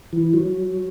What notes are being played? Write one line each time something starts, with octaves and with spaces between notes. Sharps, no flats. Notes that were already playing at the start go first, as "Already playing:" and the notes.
E3
F#3